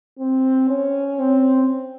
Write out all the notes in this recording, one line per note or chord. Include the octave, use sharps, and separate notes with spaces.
C4
C#4
C4